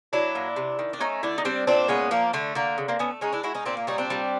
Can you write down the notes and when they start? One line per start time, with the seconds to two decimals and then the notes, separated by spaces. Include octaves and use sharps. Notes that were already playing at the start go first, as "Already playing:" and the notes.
0.13 F#3 D4 E4
0.35 A#2
0.56 C3
0.79 D#3
0.93 D4
1.00 A3 C#4 D#4
1.23 D3 D4 E4
1.38 D#4
1.45 G3 C4 D4
1.67 A#2 C4 D4
1.88 G#3 B3 C#4
2.11 F3 A#3
2.33 D3 A3
2.55 D3 A#3
2.78 C#3
2.88 A#3 C4
2.99 A3 B3 C#4
3.21 G#3 C#4 D#4
3.33 D4 E4
3.43 G#3 E4 F#4
3.55 C#4 D#4
3.66 A#2 C4 D4
3.77 A#3
3.87 G3 C#4 D#4
3.98 C4 D4
4.10 G3